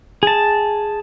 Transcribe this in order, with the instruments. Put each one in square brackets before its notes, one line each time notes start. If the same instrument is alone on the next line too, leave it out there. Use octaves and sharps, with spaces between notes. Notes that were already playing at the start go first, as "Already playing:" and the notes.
[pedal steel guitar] G#4 A5